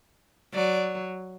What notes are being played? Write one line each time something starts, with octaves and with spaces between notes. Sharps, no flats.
F#3 D5